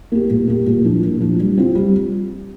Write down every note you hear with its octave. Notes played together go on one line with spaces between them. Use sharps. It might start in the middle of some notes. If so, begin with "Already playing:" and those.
A#3 G4
A#2
A#3 G4
A#2
F3 D4
A#2
F3 D4
G3
C4 F4
G3